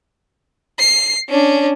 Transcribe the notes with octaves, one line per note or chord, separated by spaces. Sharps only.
C7
C#4 D4